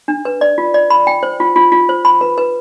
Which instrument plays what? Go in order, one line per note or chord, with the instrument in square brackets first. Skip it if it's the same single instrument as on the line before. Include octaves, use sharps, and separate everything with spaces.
[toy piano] D4
B4
D5
F4
D5
B5
G5
C5
F4
F4
F4
C5
B5
B4
B4